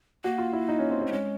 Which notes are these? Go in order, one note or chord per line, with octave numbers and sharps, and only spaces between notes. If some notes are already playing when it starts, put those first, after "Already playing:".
A#3 F#4
F4
E4
D#4
C#4
C4
C4
A3
G#3 C#4